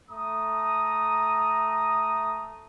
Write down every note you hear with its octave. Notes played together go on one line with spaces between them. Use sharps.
A3 A#5 D#6